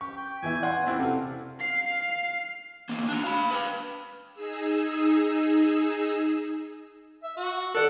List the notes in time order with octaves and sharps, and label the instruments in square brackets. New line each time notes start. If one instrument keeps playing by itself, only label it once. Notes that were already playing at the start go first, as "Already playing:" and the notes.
[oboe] G4 [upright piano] C#6
[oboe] G5
[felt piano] E2 E3 E5 [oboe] G#5
[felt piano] D5 F#5 C6
[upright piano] C4 E4 F#4 [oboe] D4
[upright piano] C3 A4 [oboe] F5
[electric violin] F5 C7
[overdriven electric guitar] E2 A#3
D4 F#4
F5 B5
B4 F5
[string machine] D#4 G#4 E6
[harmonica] E5
F#4
[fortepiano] A4 D5 [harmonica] F#5